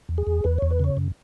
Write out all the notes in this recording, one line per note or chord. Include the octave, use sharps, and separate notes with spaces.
E2
G#4
E2
E2 B4
E2 C#5
B4
C#3 C#5
F#2